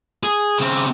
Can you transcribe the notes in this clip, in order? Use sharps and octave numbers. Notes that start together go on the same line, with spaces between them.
G#4
C#3 C4